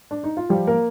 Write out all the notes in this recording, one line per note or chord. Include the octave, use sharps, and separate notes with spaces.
D4
D#4
F4
F3 G3 G4
A#3 A#4